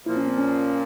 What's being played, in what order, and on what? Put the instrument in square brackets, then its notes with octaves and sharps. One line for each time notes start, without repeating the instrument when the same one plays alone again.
[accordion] A#2 F3 A#3 [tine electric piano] E4
[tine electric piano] C#4
C4
C#4